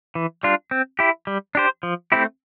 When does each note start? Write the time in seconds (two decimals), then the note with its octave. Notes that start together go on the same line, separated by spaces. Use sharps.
0.15 E3
0.43 G3 D4 F4
0.71 C4
0.99 E4 G4
1.27 G3
1.55 D4 G4 C5
1.83 F3
2.12 A3 C4 E4 G4